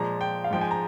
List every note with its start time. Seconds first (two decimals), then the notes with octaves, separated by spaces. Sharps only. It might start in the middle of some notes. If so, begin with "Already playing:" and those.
Already playing: A#2 F3 G#3 A#5
0.21 G5
0.44 F5
0.51 G#2 F3 G#3 G5
0.61 G#5
0.71 A#5